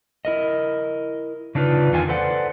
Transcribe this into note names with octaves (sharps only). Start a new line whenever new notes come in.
E4 A#4 D#5
C#3 D4 D#4 F4 B4
E2 D#3 F4 G#5
A4 B4 C5 D5 F#5